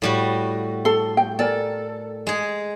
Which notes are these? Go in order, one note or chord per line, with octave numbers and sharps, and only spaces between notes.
A2 G3 F#4
A4 A5 C6
G5
A4 A#4 D5 G#5
G#3 G#4